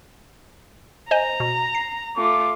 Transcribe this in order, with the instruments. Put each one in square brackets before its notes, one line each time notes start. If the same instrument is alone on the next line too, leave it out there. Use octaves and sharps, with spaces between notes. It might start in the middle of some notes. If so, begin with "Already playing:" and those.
[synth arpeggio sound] C5 D#5 G#5 [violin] A#5
[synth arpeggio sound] B2
C7
[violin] A3 F4 [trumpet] D6